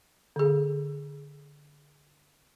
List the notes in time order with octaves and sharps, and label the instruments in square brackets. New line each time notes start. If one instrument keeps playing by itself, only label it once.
[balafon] D3 G#4